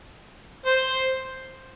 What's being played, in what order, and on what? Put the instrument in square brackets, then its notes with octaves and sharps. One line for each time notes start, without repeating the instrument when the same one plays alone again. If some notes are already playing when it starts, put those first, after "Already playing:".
[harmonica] C5